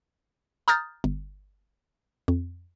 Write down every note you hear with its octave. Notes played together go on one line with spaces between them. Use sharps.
A#5 D#6 F6 G6 A6
G1
F2